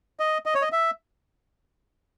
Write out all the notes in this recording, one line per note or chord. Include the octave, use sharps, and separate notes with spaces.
D#5
D#5
C#5
D#5
E5